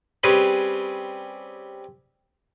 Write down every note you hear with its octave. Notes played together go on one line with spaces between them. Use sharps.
G3 C4 C#4 G4 G#4 B4